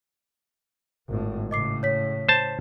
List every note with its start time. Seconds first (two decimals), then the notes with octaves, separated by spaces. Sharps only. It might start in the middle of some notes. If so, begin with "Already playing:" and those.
1.09 G#1 A2
1.51 A2 C#3 D#5 D6 C7
1.83 C#5 B6
2.29 C5 A5